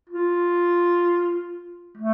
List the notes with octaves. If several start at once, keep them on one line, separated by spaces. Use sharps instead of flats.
F4
A3